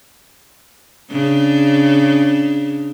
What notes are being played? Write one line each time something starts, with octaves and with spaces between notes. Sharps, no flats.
C#3 D4